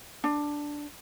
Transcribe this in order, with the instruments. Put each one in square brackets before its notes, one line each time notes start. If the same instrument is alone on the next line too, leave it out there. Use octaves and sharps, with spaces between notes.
[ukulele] D4